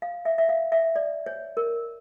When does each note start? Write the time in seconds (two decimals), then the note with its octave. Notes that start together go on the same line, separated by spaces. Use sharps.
0.02 F5
0.25 E5
0.38 E5
0.49 F5
0.72 E5
0.96 D5
1.26 C#5
1.57 A#4